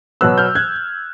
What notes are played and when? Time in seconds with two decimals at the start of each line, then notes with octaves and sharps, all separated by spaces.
0.21 B2 F#3 B3 E6 F#6
0.38 F6 G6
0.55 F#6 G#6